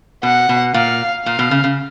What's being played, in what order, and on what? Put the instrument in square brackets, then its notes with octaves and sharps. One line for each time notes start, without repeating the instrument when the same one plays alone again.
[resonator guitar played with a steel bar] B2 [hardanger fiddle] F#5
[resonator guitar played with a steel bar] B2
[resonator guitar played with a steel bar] A#2 [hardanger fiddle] F5
[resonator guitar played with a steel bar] A#2 [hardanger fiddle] F5
[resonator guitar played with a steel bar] B2
C#3
C#3